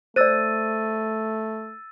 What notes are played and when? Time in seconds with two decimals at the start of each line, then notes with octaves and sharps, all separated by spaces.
0.16 A3 C5 D5 E6 A6 D#7